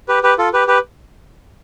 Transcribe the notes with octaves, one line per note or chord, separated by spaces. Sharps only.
G4 B4
G4 B4
F4 A4
G4 B4
G4 B4